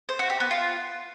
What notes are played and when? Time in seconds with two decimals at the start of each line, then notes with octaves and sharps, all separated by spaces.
0.09 C5
0.19 F#4
0.30 G4
0.40 B3
0.51 F4